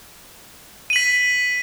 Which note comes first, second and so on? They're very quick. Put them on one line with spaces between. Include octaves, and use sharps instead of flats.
D#7 F#7 B6